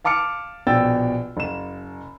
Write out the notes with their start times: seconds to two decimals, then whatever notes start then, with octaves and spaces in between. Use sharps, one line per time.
0.04 F5 A5 D6 F6 C#7
0.67 A#1 B2 G5 E6 A6
1.37 F#1 E7